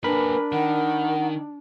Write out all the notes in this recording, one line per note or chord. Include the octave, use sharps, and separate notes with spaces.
A#3 D4 G#4 A#4 B4 B5
D#3 F#5